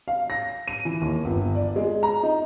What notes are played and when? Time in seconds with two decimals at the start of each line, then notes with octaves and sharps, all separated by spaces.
0.08 F5
0.30 A#6
0.68 D#7
0.85 E3
1.01 D#2
1.25 G1
1.55 D5
1.76 G#3
2.03 A#5
2.23 D#4